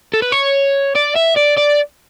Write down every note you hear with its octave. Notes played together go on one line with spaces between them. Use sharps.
A4
B4
C#5
D5
E5
D5
D5